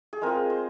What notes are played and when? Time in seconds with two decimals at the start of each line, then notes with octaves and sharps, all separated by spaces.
0.13 G#4
0.22 G#3 C4 F4 A#4
0.50 C5